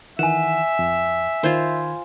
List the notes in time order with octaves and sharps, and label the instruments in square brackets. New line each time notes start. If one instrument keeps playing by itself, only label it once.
[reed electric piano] D#3 E3 F#5 [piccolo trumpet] E5 [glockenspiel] G#5 E7
[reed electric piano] F2
[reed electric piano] D#3 B5 G#6 [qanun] F4 C5